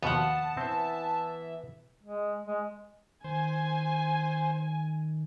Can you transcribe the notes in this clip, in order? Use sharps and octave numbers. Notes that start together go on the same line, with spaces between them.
D#2 B2 F3 B3 F#5 A5
E3 C4 C5 E5
G#3
G#3
D#3 C5 G#5